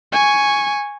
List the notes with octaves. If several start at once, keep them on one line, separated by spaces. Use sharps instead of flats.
G#5 C#6